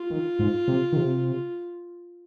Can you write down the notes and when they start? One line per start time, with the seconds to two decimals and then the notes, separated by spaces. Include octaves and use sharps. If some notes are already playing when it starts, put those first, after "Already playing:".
Already playing: F4
0.10 D#3
0.39 G#2
0.68 C3
0.93 D#3
0.97 C3